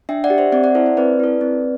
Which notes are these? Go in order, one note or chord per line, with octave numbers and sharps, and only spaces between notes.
D4 E5 G5
D5 F#5
G4
C5 E5
C4 D5 F#5
D5 F#5
E4 A4 C5 E5
C5
C4 B4 D5
E4 A4
C4